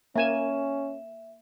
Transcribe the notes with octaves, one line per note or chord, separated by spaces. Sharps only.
A#3 C#4 E5 G#5 E7